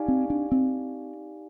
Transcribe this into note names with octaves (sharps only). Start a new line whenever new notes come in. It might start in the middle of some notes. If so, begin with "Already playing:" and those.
Already playing: D#4 G4 D5 F5 G#5
C4
D4
C4